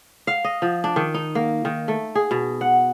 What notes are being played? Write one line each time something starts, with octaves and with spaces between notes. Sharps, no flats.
F5
D#5
F3
D4
D#3
D#4
A#3
D#3
A3
G#4
B2
F#5